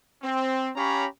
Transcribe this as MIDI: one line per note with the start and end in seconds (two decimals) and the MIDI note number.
0.22 0.70 60
0.76 1.06 61
0.76 1.06 67
0.76 1.06 73
0.76 1.06 77
0.76 1.06 82
0.76 1.06 83